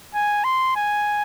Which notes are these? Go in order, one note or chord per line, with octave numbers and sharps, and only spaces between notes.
G#5
C6
G#5